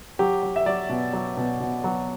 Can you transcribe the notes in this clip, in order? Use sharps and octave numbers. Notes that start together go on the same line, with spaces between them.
F#3 G4
F#3
E5
F#3 D5
B2
F#3
B2
B2
F#3